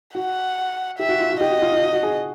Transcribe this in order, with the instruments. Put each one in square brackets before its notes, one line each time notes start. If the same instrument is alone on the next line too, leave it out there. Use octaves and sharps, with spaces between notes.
[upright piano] F#4 [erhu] F#5
[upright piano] G4 [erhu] E5
[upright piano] F#4
F4
F#4
[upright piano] G4 [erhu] D#5
[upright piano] F#4
F4
F4
F#4
F#4
G#4